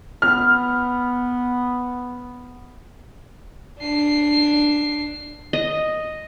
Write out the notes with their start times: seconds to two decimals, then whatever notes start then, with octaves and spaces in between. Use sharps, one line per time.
0.22 B3 F6
3.80 D4 C7
5.53 D#5